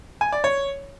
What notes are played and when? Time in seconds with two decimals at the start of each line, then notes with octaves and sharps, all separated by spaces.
0.21 G#5
0.32 D5
0.44 C#5